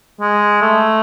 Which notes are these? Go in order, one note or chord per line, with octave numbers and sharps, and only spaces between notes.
G#3
A3